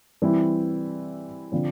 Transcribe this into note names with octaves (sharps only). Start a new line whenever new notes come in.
E3 G3 C4 E4
D3 F3 C4